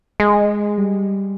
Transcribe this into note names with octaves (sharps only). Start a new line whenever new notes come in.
G#3
G3